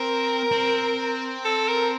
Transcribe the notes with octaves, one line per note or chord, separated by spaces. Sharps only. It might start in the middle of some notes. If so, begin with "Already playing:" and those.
Already playing: C4 A#4
C4
A4
A#4